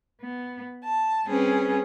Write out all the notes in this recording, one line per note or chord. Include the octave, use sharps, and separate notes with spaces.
B3
A5
G3 C4 C#4 G#4 B4